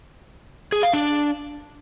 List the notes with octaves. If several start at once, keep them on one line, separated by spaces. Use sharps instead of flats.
G#4
F5
D4